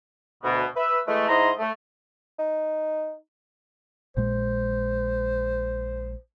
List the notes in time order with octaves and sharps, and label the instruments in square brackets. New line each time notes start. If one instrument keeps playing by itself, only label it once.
[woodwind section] D2 B2
B4 E5
E3 G#3 A3
G#2 E4 D#5 A#5 C6
A3
[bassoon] D#4
[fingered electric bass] A#1 A#2 G#3 [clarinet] C5